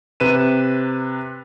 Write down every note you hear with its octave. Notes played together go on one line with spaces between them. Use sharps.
C3 B4 D#7 E7